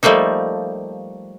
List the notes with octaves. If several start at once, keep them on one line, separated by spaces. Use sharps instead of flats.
F3 G3 A3 A#3 D#4